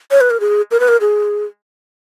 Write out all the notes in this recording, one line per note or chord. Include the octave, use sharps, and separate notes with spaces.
C#5
B4
A#4
G#4
A#4
B4
A#4
G#4